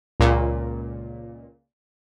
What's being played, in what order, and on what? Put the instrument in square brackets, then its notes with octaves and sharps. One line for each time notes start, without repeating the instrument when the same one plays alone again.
[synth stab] C#2 A#2